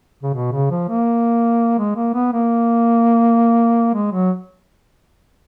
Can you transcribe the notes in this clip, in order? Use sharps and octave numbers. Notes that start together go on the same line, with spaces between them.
C#3
B2
C#3
F3
A#3
G#3
A#3
B3
A#3
G#3
F#3